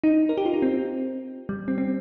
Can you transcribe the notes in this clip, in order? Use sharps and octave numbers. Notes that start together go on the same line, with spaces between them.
D#4
A#4
G4
F4
D#4
C4
G3
C4
C4